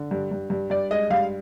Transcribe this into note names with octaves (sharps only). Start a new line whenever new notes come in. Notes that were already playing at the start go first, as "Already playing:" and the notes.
Already playing: D3
G2
G2
G2
G2 D5
G#3 D#5
G2 F5